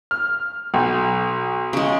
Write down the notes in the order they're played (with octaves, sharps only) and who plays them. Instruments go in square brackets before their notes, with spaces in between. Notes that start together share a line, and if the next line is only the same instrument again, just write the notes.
[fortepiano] F6
B1
[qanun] C#3 G#3